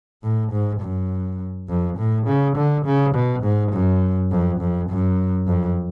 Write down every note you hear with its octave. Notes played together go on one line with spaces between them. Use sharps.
A2
G#2
F#2
F2
A2
C#3
D3
C#3
B2
G#2
F#2
F2
F2
F#2
F2